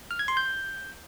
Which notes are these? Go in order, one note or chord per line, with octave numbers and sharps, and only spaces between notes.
F6
G#6
C6
G6